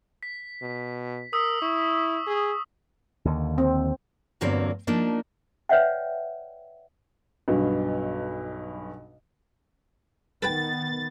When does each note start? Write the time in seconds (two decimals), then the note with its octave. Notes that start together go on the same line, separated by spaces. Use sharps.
0.23 B6
0.62 B2
1.33 A#4 D#6 E6 B6
1.62 E4 C#6
2.27 G#4
3.25 D#2 D3
3.58 C4
4.41 E2 G2 D3 F#3 A#3 C4
4.87 F3 A#3 D4 D#4
5.69 B4 C#5 D5 E5 F#5 G5
7.48 B1 G2 B2
10.42 D#3 B3 A4 B4 G5 A6